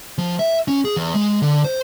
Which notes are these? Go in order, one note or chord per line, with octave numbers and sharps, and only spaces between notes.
F3
E5
C#4
G#4
E2
G#3
D3
C5